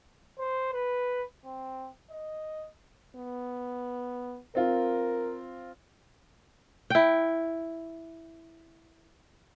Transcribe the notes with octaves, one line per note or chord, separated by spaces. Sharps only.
C5
B4
C4
D#5
B3
C4 F4 A#4
E4 G5